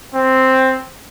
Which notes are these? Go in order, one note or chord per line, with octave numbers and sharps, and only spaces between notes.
C4